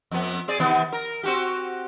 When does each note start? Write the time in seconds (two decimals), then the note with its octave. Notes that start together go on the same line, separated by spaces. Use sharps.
0.11 F2 B3
0.48 C4 G#4 D5
0.60 C3 D#3 B3
0.93 A#4
1.23 C4 F#4 G4